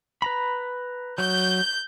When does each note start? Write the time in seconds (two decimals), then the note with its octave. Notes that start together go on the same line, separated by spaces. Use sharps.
0.22 B4 A#5 B5
1.18 F#3 G6